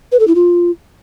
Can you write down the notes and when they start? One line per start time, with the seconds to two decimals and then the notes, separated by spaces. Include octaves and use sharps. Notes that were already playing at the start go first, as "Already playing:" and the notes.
0.12 B4
0.20 A4
0.27 E4
0.35 F4